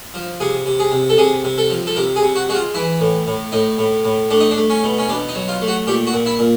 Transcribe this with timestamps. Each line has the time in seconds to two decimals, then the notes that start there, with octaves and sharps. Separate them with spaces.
0.14 F3
0.40 C3 G#4
0.66 C3
0.80 G#4
0.92 C3
1.10 A4
1.18 C3 G#4
1.44 C3
1.58 A4
1.70 F3
1.87 A4
1.96 C3 A#4
2.16 G#4
2.23 C3
2.36 F#4
2.49 G#3 F#4
2.55 F4
2.74 E3 E4
3.00 A2
3.27 A2
3.52 A2 D#4
3.78 A2
4.05 A2
4.31 A3 D4
4.40 D#4
4.51 D4
4.57 A3
4.70 C#4
4.83 B2
4.99 C#4
5.09 B2 D4
5.29 D#4
5.35 F#3
5.48 F4
5.61 A3
5.68 F#4
5.87 A#2 G4
6.07 F#4
6.13 A#2
6.26 E4
6.39 A#2